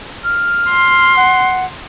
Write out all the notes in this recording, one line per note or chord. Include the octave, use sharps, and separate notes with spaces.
F6
C6
F#5